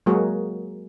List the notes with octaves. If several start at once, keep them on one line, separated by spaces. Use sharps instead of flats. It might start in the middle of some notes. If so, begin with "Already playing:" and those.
F#3 G#3 A#3 F#4 G#4 A#4